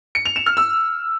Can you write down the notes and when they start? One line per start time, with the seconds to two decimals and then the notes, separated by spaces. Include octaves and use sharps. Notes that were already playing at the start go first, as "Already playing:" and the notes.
0.15 C#7
0.25 F7
0.36 E7
0.46 F6
0.57 E6